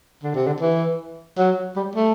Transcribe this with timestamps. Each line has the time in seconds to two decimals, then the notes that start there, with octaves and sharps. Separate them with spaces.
0.23 D3
0.35 C3
0.47 D3
0.60 E3
1.38 F#3
1.76 G3
1.95 A3